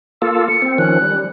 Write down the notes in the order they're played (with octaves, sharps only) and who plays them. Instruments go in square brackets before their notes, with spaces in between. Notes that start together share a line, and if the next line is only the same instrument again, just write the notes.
[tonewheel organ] A#3 F4 A4 [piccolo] E6
[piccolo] C#7
[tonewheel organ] C4
[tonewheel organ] D#3 F3 C#4 [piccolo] F#6
[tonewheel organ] G3